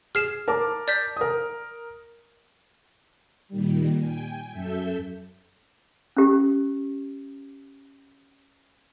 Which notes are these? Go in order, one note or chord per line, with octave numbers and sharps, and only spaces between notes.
G#4 F6 C7 E7
A#4 A5 D6
D5 G6 B6
A#4 D#6
A#2 D#3 G3
G5 G#5
F#2 A4 E5 G6
C#4 G4